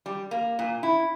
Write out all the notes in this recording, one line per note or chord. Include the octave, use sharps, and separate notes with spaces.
G3
A#3
A#2
E4